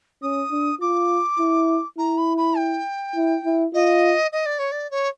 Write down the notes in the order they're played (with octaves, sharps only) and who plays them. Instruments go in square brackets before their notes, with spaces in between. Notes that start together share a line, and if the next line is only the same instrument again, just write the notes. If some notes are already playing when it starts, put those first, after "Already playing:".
[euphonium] C#4 [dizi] D#6
[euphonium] D4
[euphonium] F4 [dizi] D6
[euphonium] E4
[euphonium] E4 [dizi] A#5
[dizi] B5
B5
G5
[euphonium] E4
E4
[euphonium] F4 [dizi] D#5
[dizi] D#5
D5
C#5
D5
C#5